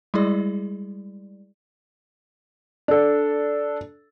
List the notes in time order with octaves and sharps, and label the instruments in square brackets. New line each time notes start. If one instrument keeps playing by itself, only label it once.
[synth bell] G3 G#3 E4 G#4 D5
[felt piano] D4 A4